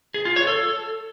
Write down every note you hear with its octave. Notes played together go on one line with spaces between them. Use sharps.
G#4
F4
C#5
A4